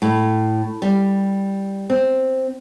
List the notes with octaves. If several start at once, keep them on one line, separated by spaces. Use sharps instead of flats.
A2
G3
C4